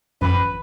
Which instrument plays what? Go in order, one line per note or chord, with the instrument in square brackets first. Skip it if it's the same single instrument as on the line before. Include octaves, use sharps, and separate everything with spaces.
[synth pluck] G#1 F#2 F3 [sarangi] B4